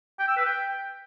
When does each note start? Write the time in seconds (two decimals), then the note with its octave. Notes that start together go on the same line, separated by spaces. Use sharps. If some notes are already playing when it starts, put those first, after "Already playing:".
0.19 G5
0.28 E6
0.37 B4
0.45 G5